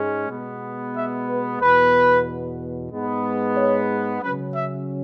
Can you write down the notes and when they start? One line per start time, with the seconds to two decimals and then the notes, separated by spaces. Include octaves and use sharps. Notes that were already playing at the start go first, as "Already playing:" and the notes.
Already playing: G#2 G#3 C#4
0.30 B2 G#3 B3
0.95 E5
1.28 B4
1.61 E2 B2 B3 B4
2.91 G#2 G#3 B3
3.57 C#5
4.22 C#3 F#3 C#4 B4
4.55 E5